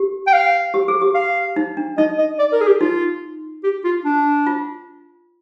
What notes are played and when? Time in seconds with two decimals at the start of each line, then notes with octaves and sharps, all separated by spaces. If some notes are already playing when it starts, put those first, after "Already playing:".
Already playing: G4
0.27 G5
0.33 F5
0.74 G4
0.88 G#4
1.01 G4
1.15 F5
1.56 D#4
1.77 D4
1.98 D#4 D#5
2.18 D#5
2.39 D5
2.53 A#4
2.61 G#4
2.67 G4
2.81 D#4 F4
3.64 G4
3.85 F4
4.05 D4
4.47 F4